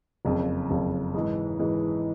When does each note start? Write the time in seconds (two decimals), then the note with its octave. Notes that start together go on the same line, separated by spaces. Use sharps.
0.25 F#1 F2 C#3
0.70 F#1 F2 C#3
1.14 G#2 E3 G#3
1.59 G#2 E3 G#3